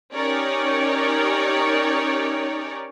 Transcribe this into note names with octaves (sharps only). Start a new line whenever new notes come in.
C#4 D#4 G4 A#4 C#5 D5